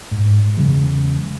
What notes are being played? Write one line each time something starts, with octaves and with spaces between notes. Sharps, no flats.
G#2
E2 C#3 F#3 G#3